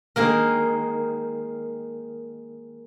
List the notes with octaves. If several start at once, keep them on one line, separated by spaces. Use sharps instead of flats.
D#3 G#3 A#3 A#4